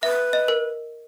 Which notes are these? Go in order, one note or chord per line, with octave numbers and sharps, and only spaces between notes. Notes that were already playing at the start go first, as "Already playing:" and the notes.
B4 E5
D#5
A#4